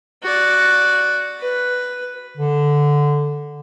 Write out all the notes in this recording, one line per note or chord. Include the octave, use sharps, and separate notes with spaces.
F#4 D5
B4
D3